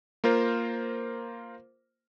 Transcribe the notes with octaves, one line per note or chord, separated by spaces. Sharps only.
A#3 F4 A#4 C5